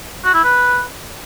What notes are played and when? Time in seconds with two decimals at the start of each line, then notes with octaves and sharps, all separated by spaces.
0.25 F#4
0.34 E4
0.44 B4